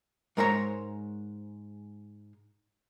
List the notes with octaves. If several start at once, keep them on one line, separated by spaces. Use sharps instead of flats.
G#2 G#3 A#4 C5 C#5 A#5